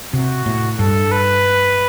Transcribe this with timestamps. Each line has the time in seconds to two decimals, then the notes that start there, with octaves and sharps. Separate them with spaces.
0.13 C3 F#4
0.46 A2
0.79 G2 A4
1.11 B4